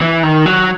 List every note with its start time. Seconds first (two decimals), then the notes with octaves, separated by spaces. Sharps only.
0.01 E3
0.23 D#3
0.46 F#3